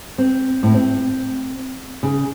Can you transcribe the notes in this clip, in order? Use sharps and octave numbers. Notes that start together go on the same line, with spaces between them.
C4
A2
C4
C#3